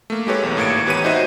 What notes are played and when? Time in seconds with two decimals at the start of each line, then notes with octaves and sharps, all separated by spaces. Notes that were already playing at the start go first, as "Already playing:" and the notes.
0.10 A3 A#3
0.27 G#3 E4 G4 A4 B4 C#5
0.43 B1 E2
0.57 G#1 A2 A#3 G#6 C#7 D7
0.86 E2 G4 B4 C#5 D#7
1.04 D#4 F#4 B4 C5 D#5 E5